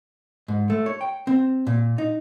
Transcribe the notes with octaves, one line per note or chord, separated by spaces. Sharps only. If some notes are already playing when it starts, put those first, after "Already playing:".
G#2
A3
C#5
G5
C4
A#2
D#4